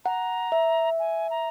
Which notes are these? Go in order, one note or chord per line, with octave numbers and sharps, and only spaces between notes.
F#5 A#5
E5
G#5
A#5